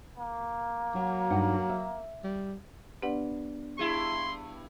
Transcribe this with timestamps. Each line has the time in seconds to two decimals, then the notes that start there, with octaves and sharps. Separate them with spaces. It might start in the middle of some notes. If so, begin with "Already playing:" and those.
0.18 A#3
0.95 F#3 F#4
1.30 G2 D#4 F#5
1.69 E5
2.24 G3
3.02 B3 D4 G4 B4 D5 F#5
3.79 G2 E4 G#4 C6